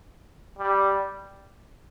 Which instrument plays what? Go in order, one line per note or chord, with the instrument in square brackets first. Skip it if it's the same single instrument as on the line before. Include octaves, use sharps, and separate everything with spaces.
[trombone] G3